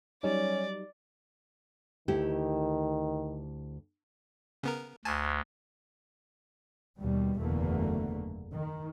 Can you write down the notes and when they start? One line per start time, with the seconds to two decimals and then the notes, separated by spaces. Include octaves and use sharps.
0.23 F#3 G3 C#4 D#4 D5
2.08 D2 D#3 E4 G4
4.63 C#3 B3 A#4
5.05 D2 G#5 A5
6.98 D#2 B2 G3
7.38 F#1 E2 B2 D3 A3 A#3
8.52 D#3